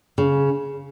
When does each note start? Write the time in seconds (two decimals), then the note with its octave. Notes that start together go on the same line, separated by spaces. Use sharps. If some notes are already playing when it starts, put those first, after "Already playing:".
0.18 C#3